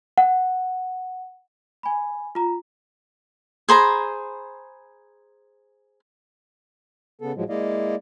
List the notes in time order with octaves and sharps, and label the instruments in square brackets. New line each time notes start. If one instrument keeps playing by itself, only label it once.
[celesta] F#5
G#5 B5
F4 A#5
[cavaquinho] G#4 C5 A#5 B5
[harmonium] C#3 B3 A4
A2 F3 F#3 G#3
G#3 A#3 E4 D5 D#5 F5